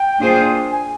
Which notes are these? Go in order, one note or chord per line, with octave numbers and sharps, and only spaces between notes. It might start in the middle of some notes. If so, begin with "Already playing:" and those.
Already playing: G5
A#3 D4 F4 G#4 C5
G#5